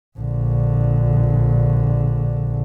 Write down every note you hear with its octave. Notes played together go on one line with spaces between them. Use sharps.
A#1 D3